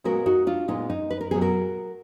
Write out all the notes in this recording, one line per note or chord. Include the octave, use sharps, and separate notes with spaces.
A#2 G#3 B3 F#4 A#4
D#4 F#4
D4 F4
A#2 G#3 B3 D#4
D#4
B4
A#4
B2 F#3 B3 G#4
F#4 A#4